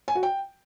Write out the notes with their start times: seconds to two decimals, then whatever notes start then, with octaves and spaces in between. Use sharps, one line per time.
0.08 G#5
0.15 F#4
0.23 G5